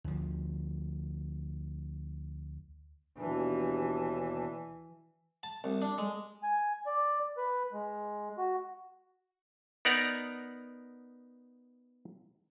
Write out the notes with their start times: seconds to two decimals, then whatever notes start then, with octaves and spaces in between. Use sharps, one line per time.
0.04 D2 F3
3.18 D#2 B2 E3 D4
5.43 A5
5.64 C2
5.82 D4
5.98 G#3
6.43 G#5
6.86 D5
7.37 B4
7.73 G#3
8.38 F#4
9.85 B3 D#4 A#4 D5 F#5 A#5